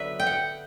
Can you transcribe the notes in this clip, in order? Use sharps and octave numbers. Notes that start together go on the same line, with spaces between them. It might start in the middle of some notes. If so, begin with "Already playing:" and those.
Already playing: D3 F#3 B3 B4 E5
G5
F#5